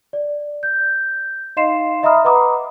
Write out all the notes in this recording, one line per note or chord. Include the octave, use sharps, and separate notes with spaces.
D5
G6
D#4 D#5 F5 C6 C7 E7
D#5 E5 A#5 B5 D#6 F6
B4 F#5 A#5 B5 D6 D#6